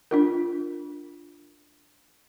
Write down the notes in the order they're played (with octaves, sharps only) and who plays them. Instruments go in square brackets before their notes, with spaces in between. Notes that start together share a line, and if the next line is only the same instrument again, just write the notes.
[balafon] D4 F4 A#4